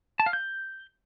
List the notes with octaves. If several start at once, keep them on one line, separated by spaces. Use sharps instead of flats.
A5
F5
G6